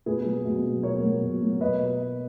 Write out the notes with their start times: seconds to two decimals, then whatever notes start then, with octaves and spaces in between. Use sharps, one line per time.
0.06 B2 G#4 B4
0.25 F#3 A#3
0.45 B2
0.65 F#3 A#3
0.83 B2 A#4 C#5
1.03 F#3 A#3
1.22 B2
1.42 F#3 A#3
1.61 B2 B4 D#5